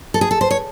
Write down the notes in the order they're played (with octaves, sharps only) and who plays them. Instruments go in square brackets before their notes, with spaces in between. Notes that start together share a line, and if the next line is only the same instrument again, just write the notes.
[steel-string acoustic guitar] A4
G#4
A4
C5
C#5